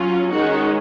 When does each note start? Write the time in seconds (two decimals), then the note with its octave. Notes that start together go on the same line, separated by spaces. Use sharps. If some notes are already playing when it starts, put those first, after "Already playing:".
Already playing: F#3 C#4 F4
0.31 D#3 G#3 C#4 D#4 F#4